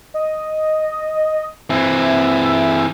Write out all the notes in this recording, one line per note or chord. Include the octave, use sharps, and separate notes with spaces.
D#5
E3 C4 E5